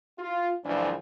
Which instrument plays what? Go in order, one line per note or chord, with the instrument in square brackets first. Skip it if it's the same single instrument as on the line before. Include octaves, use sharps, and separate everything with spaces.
[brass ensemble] F4
F#1 C#2 F#2 E3 F3 D4